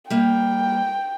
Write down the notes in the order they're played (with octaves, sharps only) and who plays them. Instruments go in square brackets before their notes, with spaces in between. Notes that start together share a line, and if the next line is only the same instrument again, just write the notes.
[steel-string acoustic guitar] G3 A#3 [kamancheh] G5